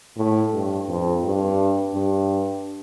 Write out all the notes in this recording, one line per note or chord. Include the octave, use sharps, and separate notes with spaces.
A2
G2
F2
G2
G2